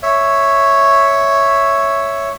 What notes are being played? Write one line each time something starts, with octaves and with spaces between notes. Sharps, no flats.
C#5 E5